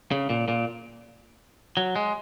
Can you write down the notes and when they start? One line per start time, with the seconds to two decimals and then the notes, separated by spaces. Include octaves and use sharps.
0.11 C#3
0.30 A#2
0.48 A#2
1.77 F#3
1.96 G#3